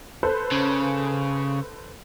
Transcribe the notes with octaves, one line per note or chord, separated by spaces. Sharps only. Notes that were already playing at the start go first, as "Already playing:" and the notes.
A4 B4 C5
C#3